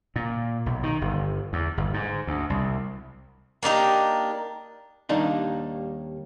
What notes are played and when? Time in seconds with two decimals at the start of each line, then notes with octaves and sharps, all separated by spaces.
0.16 A#2
0.66 B1
0.83 D#3
1.01 G1
1.53 E2
1.77 G1
1.94 G#2
2.27 D2
2.50 C2
3.63 A#3 D4 D#4 G4
5.09 D#2 G3 A#3 D4 D#4